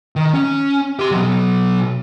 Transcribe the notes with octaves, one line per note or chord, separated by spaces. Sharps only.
D#3
C#4
G4 C6
B2 F#3